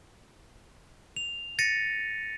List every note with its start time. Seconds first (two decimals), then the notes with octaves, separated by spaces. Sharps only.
1.16 F7
1.59 A6 A#6 C#7 D#7